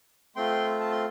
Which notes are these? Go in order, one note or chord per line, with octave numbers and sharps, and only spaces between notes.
A3 C4 F4 G5 C6
A5
C6